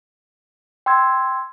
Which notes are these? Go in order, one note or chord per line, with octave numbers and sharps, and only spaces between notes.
G5 C6 E6 G#6